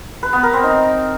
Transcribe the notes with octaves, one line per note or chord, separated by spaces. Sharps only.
B4
B3
A#4
C4
D#4